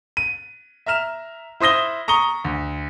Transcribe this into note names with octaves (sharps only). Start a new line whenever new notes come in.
D#7
E5 A#5 F6 E7
E4 C5 D#6 A#6 G7
A#5 C#6 D#6 G7
D2